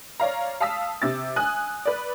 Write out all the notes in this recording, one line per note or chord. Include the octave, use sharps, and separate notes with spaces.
C#5 D5 F5 A#5
F5 A5 D#6 E6 B6
C3 E6 A6
G#5 D#6 F#6
B4 D5